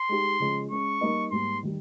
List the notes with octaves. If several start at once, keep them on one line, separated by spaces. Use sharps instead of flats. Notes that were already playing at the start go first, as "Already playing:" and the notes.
Already playing: C6
G#3 D#4 G4
C#3 F3 G#3 C#4
G#3 C#4 G#4 C#6
G3 A#3 D#4 A#4 D#5
G#2 G3 A#3 C6
D#3 G3